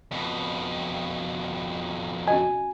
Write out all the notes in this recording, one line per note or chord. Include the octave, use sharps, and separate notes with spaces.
F2 B2
C#4 F#4 D#5 G#5